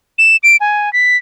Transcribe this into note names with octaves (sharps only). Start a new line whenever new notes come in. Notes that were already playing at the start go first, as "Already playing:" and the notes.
E7
D7
G#5
B6